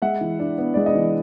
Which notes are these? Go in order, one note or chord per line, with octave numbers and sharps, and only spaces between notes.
G#3 E5 F#5
E3
D4
B3
G#3 D5
D#5
E3